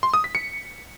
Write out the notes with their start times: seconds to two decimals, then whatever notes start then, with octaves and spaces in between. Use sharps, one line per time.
0.03 C6
0.14 D#6
0.24 B6
0.35 C#7